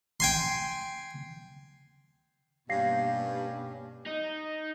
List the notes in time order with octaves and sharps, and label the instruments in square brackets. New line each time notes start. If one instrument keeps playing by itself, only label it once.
[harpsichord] G5 G#5 C6
[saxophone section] G2 [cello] B2 A#3 [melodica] C#4 G4 [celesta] F5 A#6 C7
[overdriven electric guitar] D#4